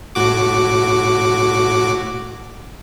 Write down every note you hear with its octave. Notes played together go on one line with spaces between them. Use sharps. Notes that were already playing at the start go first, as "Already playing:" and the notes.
A2 F#4 D6